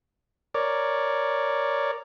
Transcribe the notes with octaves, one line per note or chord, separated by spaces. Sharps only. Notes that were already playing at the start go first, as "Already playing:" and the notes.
A#4 C#5 D5